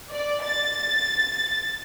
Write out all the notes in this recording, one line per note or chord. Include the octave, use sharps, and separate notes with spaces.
D5
A6